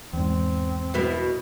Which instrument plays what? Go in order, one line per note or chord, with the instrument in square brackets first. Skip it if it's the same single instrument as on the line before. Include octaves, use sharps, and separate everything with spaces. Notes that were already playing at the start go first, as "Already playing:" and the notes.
[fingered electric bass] E2 G#2 [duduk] C4
[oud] B2 B3 E4